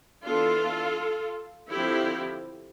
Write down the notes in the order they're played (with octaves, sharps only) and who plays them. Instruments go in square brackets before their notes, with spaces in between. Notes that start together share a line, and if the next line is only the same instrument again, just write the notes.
[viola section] E3 B3 D4 F4 A4
D3 F3 C4 E4 G4